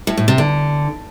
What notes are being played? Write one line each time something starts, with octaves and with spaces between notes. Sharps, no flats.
A2
A2
C3
D3